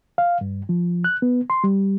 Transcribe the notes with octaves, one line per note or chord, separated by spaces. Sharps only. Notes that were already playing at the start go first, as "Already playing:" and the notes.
F5
G2
F3
F#6
B3
C6
G3